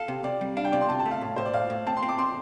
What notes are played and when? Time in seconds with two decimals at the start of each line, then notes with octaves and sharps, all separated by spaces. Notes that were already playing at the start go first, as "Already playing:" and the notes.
Already playing: A4 F5
0.08 C3
0.24 C3 D5
0.41 G3
0.57 D4 F5
0.64 G5
0.72 C3 D5
0.81 C6
0.89 C3 A5
1.00 A5
1.06 A3
1.11 F5
1.21 A2
1.36 A2 C5
1.45 D5
1.53 A2 F5
1.70 A2
1.87 C4 A5
1.97 C6
2.03 C4
2.09 D6
2.18 C4 C6